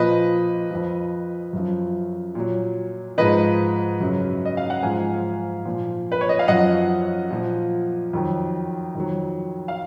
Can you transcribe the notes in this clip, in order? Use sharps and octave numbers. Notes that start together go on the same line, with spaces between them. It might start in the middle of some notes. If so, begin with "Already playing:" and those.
Already playing: A#2 F3 B4 D#5
F2 F3
F#2 F3
A#2 F#3
G#2 F3 B4 D#5
F#2 C#3 F#3
D#5
F5
F#5
G#2 F3 F5 G#5
A#2 F3
B4
C#5
D#5
F5
F#2 F3 D#5 F#5
A#2 F3
F2 D#3 F#3
F2 D#3 F#3
F5